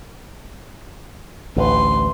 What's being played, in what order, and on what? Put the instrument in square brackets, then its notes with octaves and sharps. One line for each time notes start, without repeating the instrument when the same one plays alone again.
[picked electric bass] A1 D2 [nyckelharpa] B4 C6